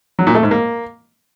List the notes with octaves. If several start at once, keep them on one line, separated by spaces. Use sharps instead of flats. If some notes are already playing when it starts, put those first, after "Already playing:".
F#3
A#2
A3
G#2
A#3